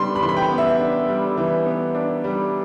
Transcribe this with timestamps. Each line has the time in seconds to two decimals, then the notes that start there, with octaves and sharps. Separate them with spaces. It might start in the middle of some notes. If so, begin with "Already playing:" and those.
Already playing: G3 B3 D4 B5 C6
0.16 B5
0.22 E3 C6
0.29 B5
0.37 G5
0.51 B3
0.58 E5
0.80 D4
1.09 G3
1.37 E3
1.66 B3
1.95 D4
2.24 G3